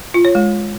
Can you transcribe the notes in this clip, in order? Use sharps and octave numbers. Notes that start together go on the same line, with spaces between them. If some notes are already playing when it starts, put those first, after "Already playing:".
F4
C#5
G#3